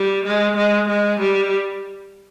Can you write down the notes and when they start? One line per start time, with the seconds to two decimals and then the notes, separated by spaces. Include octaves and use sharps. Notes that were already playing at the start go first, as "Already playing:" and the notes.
Already playing: G3
0.25 G#3
0.56 G#3
0.88 G#3
1.19 G3